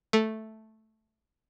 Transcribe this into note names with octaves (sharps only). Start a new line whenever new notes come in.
A3